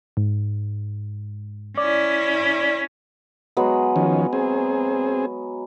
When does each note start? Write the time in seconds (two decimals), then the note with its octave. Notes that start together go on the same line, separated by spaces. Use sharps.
0.17 G#2
1.77 C#4 E4 D5
3.57 F#3 G#3 B3
3.96 D#3 F3 C#4
4.33 C4 G#4